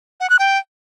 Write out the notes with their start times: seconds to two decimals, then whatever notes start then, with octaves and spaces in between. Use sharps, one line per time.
0.20 F#5
0.30 F#6
0.39 G5